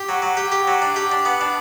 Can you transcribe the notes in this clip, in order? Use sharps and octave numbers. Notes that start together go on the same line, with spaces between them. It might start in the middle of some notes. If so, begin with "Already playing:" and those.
Already playing: G4
F#3
F#3
G4
G4
F#3
D4
G4
D4
B3
D4